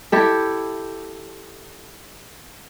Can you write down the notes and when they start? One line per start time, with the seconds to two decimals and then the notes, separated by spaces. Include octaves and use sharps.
0.12 E4 G4 A4